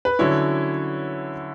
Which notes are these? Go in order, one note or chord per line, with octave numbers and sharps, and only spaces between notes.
B4
D3 F#3 C#4 E4 C#5